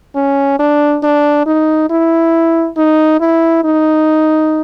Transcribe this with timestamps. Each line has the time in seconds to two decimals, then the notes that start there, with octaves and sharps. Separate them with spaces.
0.15 C#4
0.60 D4
1.04 D4
1.46 D#4
1.90 E4
2.77 D#4
3.21 E4
3.64 D#4